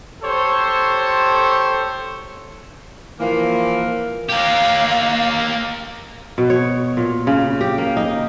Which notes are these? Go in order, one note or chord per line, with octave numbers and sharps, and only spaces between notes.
G4 A4 C5 C#5
E3 F3 A#3
A#3 G4 F5
B2
C#5
A#2
C#3
G4
A#3
D#4